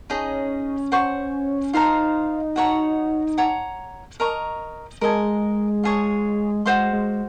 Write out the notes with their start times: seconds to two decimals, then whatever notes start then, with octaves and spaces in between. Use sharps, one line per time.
0.10 C#4 D#4 G#4 D#5
0.92 C5 F#5 C#6
1.73 D#4 F4 C5 F5 A#5
2.56 F#4 C#5 F#5 A#5
3.38 C#5 F#5 A#5
4.20 A#4 D#5 A#5 C#6
5.01 G#3 A#4 D#5 G#5
5.83 F4 G#4 C#5
6.66 G#3 F#4 C5 F5 C6
6.93 G#3